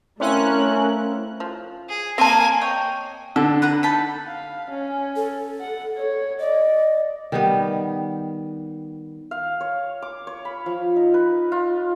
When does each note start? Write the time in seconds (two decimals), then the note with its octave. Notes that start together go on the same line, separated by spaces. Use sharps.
0.20 A3 C4 C#4 E4 A#4 F5 F#6
1.40 F3
1.89 G#4
2.18 A#3 C4 G#5 A5
2.61 C#5 D#5 G5
3.36 D3 A4
3.62 B4 F#5 A#5
3.83 D#4 A5 B5
4.26 F5
4.70 C#4
5.16 A4
5.60 F#5
5.97 C#5
6.40 D5 D#5
7.32 D#3 G3 B3
9.31 F5
9.61 C#5
10.02 D6
10.27 C#5
10.45 B5
10.66 F3
10.96 D#4
11.14 B4
11.52 F4